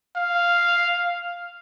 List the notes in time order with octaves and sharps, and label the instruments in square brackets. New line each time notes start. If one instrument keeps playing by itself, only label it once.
[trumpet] F5